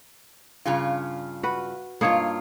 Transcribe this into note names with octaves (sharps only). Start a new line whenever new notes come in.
G2 C#3 F4
F#4 B4
G2 A#3 D#4 F4 C#5